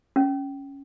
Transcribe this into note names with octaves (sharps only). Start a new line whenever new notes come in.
C#4